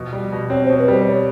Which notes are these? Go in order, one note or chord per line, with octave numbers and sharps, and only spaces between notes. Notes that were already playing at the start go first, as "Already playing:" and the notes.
Already playing: B2 F3
G3
B2
C4 C#5
C5
B2
B4
G3 C5
C#5